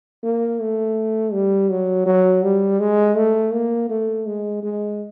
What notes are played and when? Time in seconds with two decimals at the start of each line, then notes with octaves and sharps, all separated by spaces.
0.23 A#3
0.60 A3
1.33 G3
1.70 F#3
2.06 F#3
2.43 G3
2.80 G#3
3.16 A3
3.53 A#3
3.90 A3
4.26 G#3
4.63 G#3